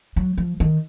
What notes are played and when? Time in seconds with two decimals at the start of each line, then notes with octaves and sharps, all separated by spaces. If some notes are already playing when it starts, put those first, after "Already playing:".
0.16 F#3
0.38 F3
0.60 D#3